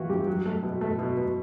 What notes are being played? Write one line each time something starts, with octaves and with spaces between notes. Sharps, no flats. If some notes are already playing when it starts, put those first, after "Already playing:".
Already playing: E3 F4 F#4
G2 G4
F#3
A3
B2
A3
B2
B2